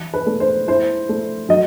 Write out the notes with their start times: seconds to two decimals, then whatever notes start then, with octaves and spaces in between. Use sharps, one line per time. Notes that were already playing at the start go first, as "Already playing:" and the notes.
Already playing: E3 E4
0.14 B4
0.26 A3
0.40 C5
0.68 E4 C5
1.09 A3
1.49 F#3 D#5